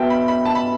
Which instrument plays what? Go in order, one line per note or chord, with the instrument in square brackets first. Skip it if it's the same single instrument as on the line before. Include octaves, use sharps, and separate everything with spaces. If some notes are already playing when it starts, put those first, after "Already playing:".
Already playing: [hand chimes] B3 F#4 B4 E5 [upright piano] G5 A5
[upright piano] B5
B5
A5
B5